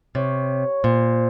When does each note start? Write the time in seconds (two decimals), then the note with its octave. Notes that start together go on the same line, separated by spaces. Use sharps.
0.15 C3 C#5
0.84 A#2 C5